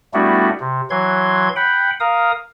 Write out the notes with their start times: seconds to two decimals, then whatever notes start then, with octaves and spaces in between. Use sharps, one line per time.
0.14 G3 A3 B3 D4 E4 F#4
0.60 C3
0.90 E3 F#3 C6 G#6
1.56 F#5 G5 B5
2.00 A#4 F5 D#6